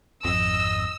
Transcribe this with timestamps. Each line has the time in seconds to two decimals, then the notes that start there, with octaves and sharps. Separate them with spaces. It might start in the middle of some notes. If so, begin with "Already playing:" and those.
0.25 G#1 F2 D#5 E6